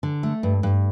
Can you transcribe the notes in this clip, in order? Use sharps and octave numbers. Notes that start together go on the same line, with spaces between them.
D3
A3
G2
G2